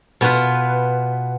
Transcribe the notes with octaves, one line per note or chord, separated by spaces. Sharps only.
B2 B3 F4 B4